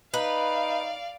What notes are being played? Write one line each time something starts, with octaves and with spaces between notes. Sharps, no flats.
D#4 B4 D5 F5